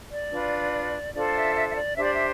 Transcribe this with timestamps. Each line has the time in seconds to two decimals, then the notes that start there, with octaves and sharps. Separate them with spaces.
0.11 D5
0.31 D4 F4 B4
1.13 D4 F4 A4 C5 D5
1.34 E5
1.55 E5
1.68 E5
1.75 D5
1.95 D4 G4 C5 E5
2.04 D5
2.13 E5